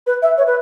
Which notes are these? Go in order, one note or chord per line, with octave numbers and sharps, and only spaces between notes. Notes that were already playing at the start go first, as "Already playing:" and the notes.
B4
E5
C#5
B4